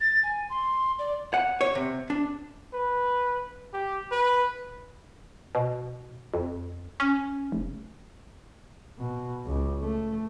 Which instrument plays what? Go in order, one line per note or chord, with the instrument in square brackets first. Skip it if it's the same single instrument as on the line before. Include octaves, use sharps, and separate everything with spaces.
[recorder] A6
G#5
C6
D5
[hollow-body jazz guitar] F#5
C#5
C3
D4
[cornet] B4
G4
B4
[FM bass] B2
F2
C#4
F1
[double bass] B2
C#2
A3